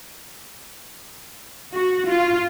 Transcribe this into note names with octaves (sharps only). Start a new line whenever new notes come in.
F#4
F4